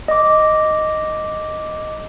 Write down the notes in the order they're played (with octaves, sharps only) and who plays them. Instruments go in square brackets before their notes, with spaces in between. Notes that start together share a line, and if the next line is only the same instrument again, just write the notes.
[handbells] D#5 D6